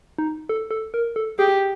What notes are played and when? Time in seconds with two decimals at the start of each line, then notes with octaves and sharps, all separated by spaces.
0.18 D#4
0.49 A4
0.71 A4
0.94 A#4
1.16 A4
1.39 G4 G#4